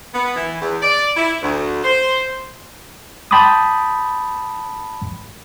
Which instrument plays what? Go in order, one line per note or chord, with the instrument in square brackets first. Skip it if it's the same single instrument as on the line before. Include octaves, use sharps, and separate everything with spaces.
[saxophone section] B3
E3
E2
D5
E4
D2
C5
[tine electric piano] G5 A5 B5 C6 D6 D#6